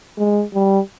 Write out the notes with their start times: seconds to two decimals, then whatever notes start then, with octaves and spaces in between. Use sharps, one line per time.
0.18 G#3
0.54 G3